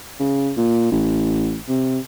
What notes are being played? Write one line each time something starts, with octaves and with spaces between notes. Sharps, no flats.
C#3
A#2
A1
C3